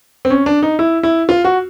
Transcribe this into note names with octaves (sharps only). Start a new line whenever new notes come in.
C4
C#4
D4
D#4
E4
E4
F4
F#4